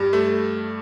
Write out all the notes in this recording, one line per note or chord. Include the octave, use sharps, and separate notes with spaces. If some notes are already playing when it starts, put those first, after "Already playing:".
Already playing: G2
A3